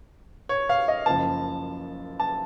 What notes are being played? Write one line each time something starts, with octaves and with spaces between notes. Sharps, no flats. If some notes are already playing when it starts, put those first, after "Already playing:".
C#5
F5
D#5
F#1 F#2 F3 A5
A5